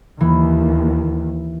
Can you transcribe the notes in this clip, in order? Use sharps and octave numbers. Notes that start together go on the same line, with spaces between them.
D#2 E3